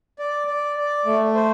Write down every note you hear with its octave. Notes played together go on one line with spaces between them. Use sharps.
D5
D5
D5
A3
C5